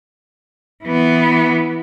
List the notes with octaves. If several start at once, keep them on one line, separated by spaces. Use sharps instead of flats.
E3 B3